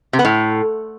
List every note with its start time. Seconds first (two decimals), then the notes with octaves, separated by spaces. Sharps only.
0.13 C3
0.19 B3
0.25 A2